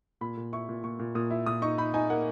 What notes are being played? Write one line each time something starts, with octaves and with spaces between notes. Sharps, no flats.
A#2 B5
A#2
E4 C#6
A#2
A#2 C#6
A#2
A#2 D#6
E4
A#2 D#6
D#4 C#6
D#4 B5
D#4 G#5
A#3 F#5